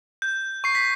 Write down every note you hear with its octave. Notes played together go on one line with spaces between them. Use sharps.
G6
C#6 C7
B6